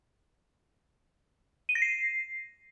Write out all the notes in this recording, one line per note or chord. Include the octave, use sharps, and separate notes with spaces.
D#7
A#6
C7